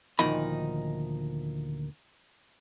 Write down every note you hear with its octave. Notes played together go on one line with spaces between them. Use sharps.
D2 A#2 D#3 F3 D#4 B5